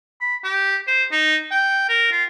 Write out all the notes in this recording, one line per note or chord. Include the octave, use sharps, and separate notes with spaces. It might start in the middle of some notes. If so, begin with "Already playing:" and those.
B5
G4
C5
D#4
G5
A#4
F4